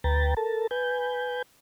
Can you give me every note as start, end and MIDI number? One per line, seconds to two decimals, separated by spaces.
0.04 0.34 38
0.04 0.34 71
0.04 0.34 79
0.04 0.34 82
0.04 0.34 93
0.37 0.67 69
0.37 0.67 70
0.37 0.67 81
0.71 1.42 71
0.71 1.42 80
0.71 1.42 91